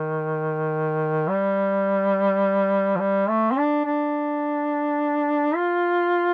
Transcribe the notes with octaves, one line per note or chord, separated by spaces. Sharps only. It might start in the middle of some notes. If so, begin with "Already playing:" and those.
Already playing: D#3
G3
F3
G3
A3
C4
D4
D4
F4